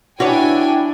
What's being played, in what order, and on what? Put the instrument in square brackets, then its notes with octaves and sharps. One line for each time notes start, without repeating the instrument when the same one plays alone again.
[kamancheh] D4 [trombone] E4 [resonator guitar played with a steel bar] F#4 B4 C#5 [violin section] G5 G#5